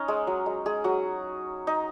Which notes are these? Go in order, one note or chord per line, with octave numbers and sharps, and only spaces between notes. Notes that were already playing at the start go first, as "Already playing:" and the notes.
Already playing: C#4 D#4
G#3
F#3
G#3
G#3 G#4
F#3 F#4
D#4